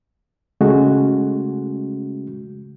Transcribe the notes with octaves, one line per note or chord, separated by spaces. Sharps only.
C#3 G#3 A3 C#4 F#4